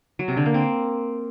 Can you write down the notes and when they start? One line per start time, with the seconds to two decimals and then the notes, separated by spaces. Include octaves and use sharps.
0.19 F#3
0.28 C3
0.37 D3
0.46 A#3
0.54 C4